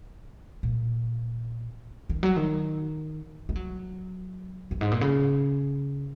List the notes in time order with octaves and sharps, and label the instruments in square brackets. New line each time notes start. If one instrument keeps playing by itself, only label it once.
[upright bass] A#2
D#3
F#3
D#3
G#3
F#3
F#2
G#2
A#2
C#3